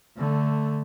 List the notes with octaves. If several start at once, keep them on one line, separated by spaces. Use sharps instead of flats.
D3 A3